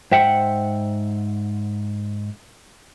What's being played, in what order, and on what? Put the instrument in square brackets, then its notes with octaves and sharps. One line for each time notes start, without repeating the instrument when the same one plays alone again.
[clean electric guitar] G#2 E5 F#5 [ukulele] C5 G5